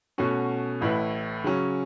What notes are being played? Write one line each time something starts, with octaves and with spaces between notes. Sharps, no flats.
B2 A3 C#4 F#4
A1 A2 A3 E4 B4
C#3 F#3 C#4